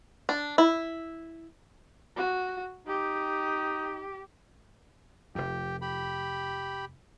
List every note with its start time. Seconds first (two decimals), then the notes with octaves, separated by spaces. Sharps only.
0.29 D4
0.58 E4
2.16 F#4
2.87 D#4 G4
5.35 F1 F2 G4
5.82 G4 B5